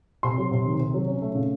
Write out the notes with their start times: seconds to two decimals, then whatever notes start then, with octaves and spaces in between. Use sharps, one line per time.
0.23 C3 C6
0.38 F#3
0.51 C3
0.66 D#3
0.80 C3
0.94 F#3
1.07 C#4
1.22 A3
1.35 C#3